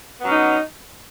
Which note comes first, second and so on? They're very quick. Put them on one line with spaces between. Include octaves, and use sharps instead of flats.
B3 F#3 C#4 D#4